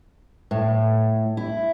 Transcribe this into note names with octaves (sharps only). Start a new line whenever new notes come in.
A2
E4